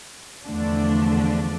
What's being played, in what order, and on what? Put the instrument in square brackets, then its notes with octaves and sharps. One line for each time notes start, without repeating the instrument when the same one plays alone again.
[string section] E2 D3 F3 A3 D4